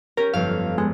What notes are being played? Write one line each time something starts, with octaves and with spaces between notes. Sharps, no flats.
C#4 G4 A#4
G1 F2 F5
G#3 B3